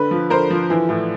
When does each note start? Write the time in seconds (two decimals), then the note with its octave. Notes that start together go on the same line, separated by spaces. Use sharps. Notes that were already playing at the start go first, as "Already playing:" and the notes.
Already playing: D3 B4
0.11 F3
0.30 D3 A#4 C5
0.50 F3
0.70 E3
0.89 A2